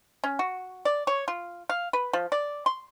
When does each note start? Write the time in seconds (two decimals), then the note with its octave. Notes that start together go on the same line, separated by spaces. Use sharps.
0.24 C#4
0.39 F#4
0.85 D5
1.07 C#5
1.28 F4
1.69 F5
1.93 B4
2.13 F3
2.32 D5
2.66 C6